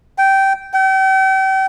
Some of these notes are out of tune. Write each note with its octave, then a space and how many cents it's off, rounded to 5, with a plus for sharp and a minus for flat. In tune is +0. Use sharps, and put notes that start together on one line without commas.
G5 -15
G5 -40